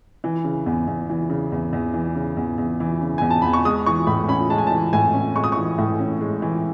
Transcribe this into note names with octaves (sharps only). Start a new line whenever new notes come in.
E3
C#3
E2
E2
E3
C#3
E2
E2
E3
C#3
E2
E2
E3
C#3
E2 G#5
A5
E2 B5
C#6
G#3 D#6
E3 C#6
A2 B5
C#4 B5
G#3 A5
G#5
E3 A5
A2 G#5
C#4
G#3 C#6
D#6
E3 C#6
A2
C#4
G#3
E3